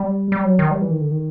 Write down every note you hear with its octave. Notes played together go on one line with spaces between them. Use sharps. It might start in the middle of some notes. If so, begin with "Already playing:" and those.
Already playing: G3
G3
F#3
D#3
G3
E3
D#3
D3
D#3